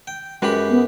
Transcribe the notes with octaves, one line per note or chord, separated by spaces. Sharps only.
G5
F#2 G#3 F#4 G4 B4 B5
B3